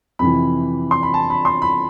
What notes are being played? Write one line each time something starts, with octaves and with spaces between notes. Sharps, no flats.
F2 C3 E3 B5
C6
B5
A5
B5
C6
B5